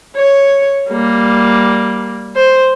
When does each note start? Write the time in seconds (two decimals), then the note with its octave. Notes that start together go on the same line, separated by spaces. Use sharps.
0.17 C#5
0.90 G3 A#3
2.36 C5